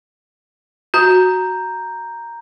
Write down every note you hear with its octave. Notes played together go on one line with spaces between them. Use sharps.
F#4 A#5 G6